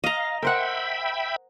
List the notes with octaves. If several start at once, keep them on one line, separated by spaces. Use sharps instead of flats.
D#5 F5 A#5
A#4 C5 E5 F#5 G5 B5